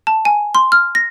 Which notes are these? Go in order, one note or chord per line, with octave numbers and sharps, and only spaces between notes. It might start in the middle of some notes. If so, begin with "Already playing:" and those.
A5
G#5
C6
F6
A#6